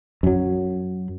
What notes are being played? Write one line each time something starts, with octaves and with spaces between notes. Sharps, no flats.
F#2 F#3